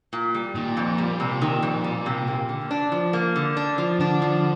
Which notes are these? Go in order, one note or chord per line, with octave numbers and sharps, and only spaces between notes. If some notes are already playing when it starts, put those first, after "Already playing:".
A#2
G3
A#2 D#3
F2
G3
C3
D#3
F2
G3
C3
A#3
D3
D4
F3
A#3
D3
D4
F3
D3 D4
F3